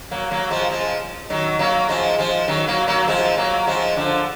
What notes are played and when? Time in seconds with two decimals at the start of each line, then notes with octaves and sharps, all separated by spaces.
0.11 F#3 A#3
0.31 F#3 A#3
0.51 F3 G#3
0.70 F3 G#3
1.30 D#3 F#3
1.59 F#3 A#3
1.89 F3 G#3
2.18 F3 G#3
2.48 D#3 F#3
2.67 F#3 A#3
2.88 F#3 A#3
3.08 F3 G#3
3.37 F#3 A#3
3.67 F3 G#3
3.96 D3 F3